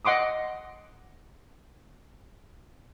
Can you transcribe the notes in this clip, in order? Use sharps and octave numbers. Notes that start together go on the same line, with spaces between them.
D#5 F#5 C6 D6 D#6